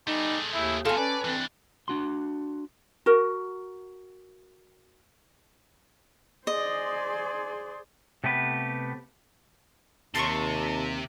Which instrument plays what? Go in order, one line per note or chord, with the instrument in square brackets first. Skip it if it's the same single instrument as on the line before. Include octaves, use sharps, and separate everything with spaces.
[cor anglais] G3 [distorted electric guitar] A3 G#4 [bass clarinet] D#4
[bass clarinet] D#2 [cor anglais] E4
[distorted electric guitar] E2 B2 [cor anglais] F4 [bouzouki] A4 G#5
[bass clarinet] C#4 [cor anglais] B4 [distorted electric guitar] D5
[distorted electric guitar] E3 D4 [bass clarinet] C4
[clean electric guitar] D4 F#4 C6
[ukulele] F#4 A#4
[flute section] G#4 C6 [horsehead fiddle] C5 D5 [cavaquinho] D#5
[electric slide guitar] C3 A3 B3 G4 B4
[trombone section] D#2 [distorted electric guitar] C3 [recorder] A5 [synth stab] C6 C#6